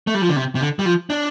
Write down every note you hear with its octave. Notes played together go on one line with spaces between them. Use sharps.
A3
G3
F3
D3
C3
C3
D3
G3
F3
D4